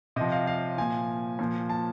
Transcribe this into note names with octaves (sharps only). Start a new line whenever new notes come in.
C3 F3 D#5
F5
F5
A#2 F3 G#5
A#2 F3
A5